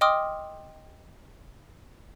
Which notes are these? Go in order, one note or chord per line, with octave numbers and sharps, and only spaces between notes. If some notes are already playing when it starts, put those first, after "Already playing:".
D#5 G5 C6 D6 D#6 F6